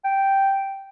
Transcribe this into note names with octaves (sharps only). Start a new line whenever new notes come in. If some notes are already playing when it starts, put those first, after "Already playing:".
G5